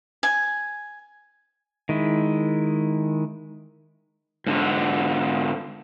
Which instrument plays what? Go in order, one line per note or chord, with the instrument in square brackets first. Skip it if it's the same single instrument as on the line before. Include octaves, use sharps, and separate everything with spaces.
[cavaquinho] G#5
[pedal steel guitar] D#3 G#3 E4
[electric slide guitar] G#2 D3